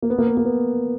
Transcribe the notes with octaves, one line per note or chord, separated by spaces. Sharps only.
A#3
B3
A#3
B3
A#3
B3